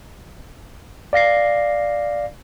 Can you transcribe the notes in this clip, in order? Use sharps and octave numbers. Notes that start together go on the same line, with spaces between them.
D5 F5 A#6 C7